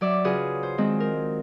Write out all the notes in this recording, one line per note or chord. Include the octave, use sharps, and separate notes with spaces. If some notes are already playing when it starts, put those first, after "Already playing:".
F#3 D5 E5
C#3 F4 F#4 G#4 B4
C5
D#3 G#3 C4
A#4